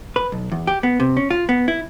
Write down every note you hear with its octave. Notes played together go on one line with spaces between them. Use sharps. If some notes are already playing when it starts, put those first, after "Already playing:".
B4
B1
E2
G4
B3
C3
C#4
F4
B3
E4